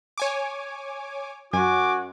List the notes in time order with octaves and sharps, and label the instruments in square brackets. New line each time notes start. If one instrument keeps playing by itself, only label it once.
[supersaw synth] C#5 G#5 D6
[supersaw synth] F#2 [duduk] F#4 [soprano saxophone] G#5 [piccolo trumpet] D6